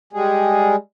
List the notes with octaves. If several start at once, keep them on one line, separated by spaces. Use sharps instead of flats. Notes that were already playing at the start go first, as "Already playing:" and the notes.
G3 G#3 G#4